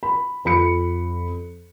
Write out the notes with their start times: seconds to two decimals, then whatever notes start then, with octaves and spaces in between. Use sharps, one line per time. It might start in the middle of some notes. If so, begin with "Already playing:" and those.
0.03 B5
0.45 F2 B5 C#7